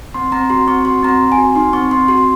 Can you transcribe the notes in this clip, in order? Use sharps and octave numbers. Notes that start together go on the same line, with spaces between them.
C4 C6
C4 A#5
F#4 C6
C4 C#6
F#4 C6
C4 A#5
C6
C4
G#5
F#4
D#4 C6
C4 C#6
C4 C6
F#4 C6